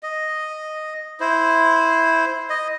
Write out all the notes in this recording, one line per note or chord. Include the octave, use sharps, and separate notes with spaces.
D#5
E4 C5
D#5